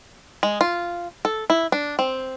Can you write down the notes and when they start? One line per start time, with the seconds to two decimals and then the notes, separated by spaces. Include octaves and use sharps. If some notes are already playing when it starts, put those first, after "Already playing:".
0.43 G#3
0.61 F4
1.25 A4
1.50 E4
1.72 D4
1.99 C4